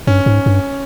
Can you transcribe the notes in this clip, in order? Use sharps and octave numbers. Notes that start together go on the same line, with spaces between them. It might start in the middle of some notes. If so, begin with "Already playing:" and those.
G2 C#4
G#2
G2